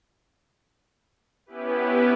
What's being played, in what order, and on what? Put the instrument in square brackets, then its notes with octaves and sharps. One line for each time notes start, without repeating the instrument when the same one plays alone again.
[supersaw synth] B3 C#4 E4 G4 B4